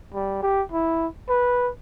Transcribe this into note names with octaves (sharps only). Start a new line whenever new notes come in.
G3
G4
E4
B4